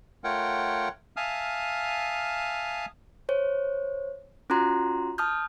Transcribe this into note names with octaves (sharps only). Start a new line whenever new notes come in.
A3 F4 A#4 C#5 F#5 G5
E5 F5 G#5 A5 D#6 F6
C5 C#5
C#4 F4 F#4 A#5 C6
A5 D#6 F6 G6